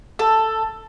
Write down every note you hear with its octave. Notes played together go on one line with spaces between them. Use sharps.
A4